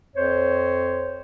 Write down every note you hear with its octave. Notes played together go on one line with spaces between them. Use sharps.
F2 C5 C#5